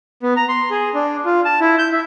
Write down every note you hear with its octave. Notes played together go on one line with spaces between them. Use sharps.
B3
A#5
C6
G#4
D4
F4
A5
E4
G6
E5